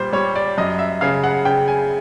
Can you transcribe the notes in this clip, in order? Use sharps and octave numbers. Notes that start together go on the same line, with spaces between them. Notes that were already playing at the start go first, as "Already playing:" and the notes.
Already playing: A#2 G3 C5
G3 C#5
D5
F#2 D#5
E5
C#3 F5
F#5
C#3 G5
G#5